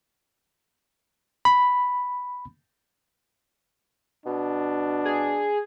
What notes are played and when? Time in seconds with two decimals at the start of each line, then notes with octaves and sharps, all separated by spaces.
1.45 B5
4.26 B2 D4
5.05 G#4